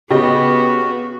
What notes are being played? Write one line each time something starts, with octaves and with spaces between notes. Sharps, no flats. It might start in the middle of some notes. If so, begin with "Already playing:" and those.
C#3 B3 F#4 G4 D#5